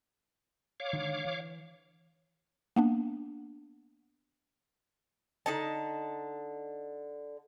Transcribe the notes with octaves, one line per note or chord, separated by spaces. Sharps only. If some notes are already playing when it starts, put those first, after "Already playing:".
C#5 F5 D6
D3 D#3 G#3
E3
A#3 B3 D4
D3 D#4 A5